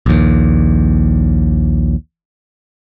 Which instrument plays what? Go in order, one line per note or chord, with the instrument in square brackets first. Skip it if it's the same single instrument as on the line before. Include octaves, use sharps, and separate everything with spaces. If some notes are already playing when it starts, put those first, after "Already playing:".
[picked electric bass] A#1 D#2